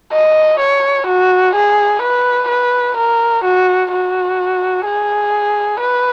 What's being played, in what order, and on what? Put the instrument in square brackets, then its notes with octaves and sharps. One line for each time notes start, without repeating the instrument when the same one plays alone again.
[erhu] D#5
C#5
F#4
G#4
B4
B4
A#4
F#4
F#4
G#4
B4